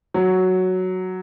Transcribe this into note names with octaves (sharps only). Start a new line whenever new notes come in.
F#3